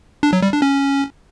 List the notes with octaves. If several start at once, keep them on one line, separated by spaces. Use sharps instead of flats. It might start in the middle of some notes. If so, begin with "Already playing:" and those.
D4
F#3
G3
D4
C#4